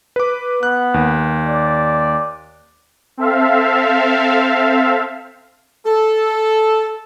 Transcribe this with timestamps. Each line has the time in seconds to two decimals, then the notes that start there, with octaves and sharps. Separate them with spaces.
0.16 B4 D6
0.63 B3 F#6
0.94 D#2
1.45 D5
3.17 C4 A4 E5 F5
5.86 A4